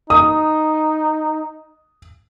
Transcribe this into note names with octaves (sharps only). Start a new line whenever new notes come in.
D#4 D#6